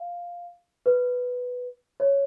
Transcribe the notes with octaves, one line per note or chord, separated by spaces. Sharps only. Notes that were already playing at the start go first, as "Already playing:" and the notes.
Already playing: F5
B4
C#5